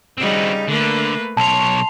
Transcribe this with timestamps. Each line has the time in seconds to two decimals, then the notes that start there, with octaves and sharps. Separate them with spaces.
0.18 C#3 G3 C4 D#4 F#4
0.68 D3 A3 A#3 B4
1.37 B1 C#5 A5 C6 F7